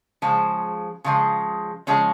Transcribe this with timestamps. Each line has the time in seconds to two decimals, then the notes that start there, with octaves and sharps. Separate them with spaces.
0.22 C#3 F3 G#3 C5
1.04 C#3 F3 G#3
1.87 C#3 F3 G#3 C#4